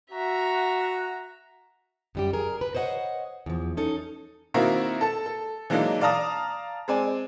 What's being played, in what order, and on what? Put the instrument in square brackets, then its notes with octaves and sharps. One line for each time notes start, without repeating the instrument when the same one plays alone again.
[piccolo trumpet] F#4 [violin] E5 A#5
[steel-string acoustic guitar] F#2 G3 G4
G#4 A#4
B4
C5 C#5 D#5 F5 F#5
E2 F3
C#4 D#4 A4
[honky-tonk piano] D#3 A#3 C4 E4 F#4 A#4
A4 A5
A4
E3 F#3 G#3 A#3 D4 D#4
D5 F5 A5 A#5 D#6
G#3 C4 D5 G#5